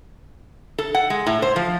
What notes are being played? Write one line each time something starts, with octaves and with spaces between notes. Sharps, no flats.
A4
F#5
G#3
A2
C5
F3